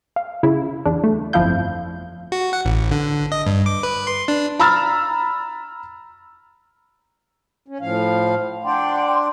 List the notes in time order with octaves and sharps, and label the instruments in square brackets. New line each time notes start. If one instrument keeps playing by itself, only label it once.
[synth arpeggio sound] F5
C#3 E4
E2 D4
A3
G1 F2 F3 E4 F5 G6
[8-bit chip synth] F#4
F#5
A1
D3
D#5
G2
D6
B4
C6
D4
[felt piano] A#5 B5 E6 F6 A6
[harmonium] C#4
A2 F3 F5
[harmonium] D4 D5 [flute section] F#5 G5 C6